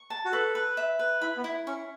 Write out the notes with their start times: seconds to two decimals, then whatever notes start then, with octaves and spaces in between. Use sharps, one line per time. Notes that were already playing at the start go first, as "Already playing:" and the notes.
Already playing: C#6
0.10 A5
0.25 F#4
0.32 A4 B4
0.55 B4
0.77 E5
0.99 B4
1.21 E4 B5
1.37 B3
1.44 E4
1.67 C#4 C#6